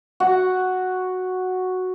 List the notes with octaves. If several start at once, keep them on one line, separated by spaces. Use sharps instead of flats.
F#4 F#5